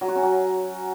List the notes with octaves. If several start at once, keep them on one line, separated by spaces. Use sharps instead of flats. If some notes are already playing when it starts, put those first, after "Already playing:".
F#3
F#4
C#4
F#3